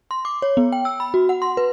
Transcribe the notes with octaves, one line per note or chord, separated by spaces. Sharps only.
C6
D6
C#5
B3
G5
E6
B5
F#4
F#5
C6
B4